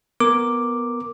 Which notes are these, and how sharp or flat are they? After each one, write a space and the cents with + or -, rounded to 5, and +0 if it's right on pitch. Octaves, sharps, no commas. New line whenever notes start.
B3 +0 A#4 +0 D6 +0